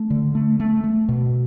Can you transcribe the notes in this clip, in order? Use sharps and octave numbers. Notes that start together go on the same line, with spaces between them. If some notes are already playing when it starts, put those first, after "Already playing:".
Already playing: A3
D3
A3
A3
A3
B2